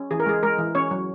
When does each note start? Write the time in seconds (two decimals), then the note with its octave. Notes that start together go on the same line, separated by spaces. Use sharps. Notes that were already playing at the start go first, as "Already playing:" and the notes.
Already playing: C#4
0.11 E3 G#4
0.20 A#4
0.26 G#3 G#4
0.43 G#3 A#4
0.58 E3
0.75 C#4 C#5
0.91 F#3